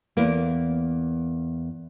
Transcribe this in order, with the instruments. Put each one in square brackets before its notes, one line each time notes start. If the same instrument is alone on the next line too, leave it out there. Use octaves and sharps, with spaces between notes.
[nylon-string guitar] E2 A#3